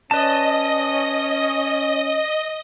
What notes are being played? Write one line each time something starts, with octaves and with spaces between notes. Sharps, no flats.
C#4 B4 D5 D#5 A5